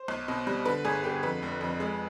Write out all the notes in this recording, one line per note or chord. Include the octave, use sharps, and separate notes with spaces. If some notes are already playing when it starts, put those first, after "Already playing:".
Already playing: C5
B1
B2
G3
D3 B4
G1 G#4
D3 G4
F2 B4
F1
F2
G#3